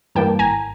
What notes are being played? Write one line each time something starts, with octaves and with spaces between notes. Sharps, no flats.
G2 E3 G3 A#3 G5 A5
G#1 G#5 A#5